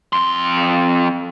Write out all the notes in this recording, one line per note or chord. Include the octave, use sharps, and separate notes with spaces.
F2 C6